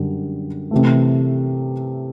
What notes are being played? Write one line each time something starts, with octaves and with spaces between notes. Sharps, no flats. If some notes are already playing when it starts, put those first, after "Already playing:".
Already playing: F#2 D3 G3
C3 E3 A3